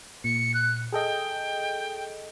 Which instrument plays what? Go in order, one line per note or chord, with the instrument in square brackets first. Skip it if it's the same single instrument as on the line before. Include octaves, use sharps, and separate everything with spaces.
[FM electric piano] A#2 [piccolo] C#7
[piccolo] F#6
[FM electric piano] G#4 A4 D#5 [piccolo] G5